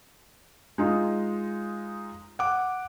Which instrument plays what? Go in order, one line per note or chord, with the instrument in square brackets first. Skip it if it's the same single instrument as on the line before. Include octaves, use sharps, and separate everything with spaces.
[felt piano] G#3 D#4 F4
F#5 D6